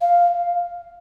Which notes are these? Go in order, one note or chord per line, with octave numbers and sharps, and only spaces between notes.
F5